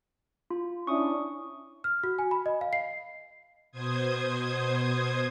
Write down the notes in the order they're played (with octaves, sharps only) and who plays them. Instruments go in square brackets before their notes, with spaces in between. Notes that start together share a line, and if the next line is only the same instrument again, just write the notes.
[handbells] F4
[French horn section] C#4 D4 E4 [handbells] C#6 D#6
[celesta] F6
F#4
G#5
B5
D#5
F5
C7
[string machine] B2 C5 D#6 G#6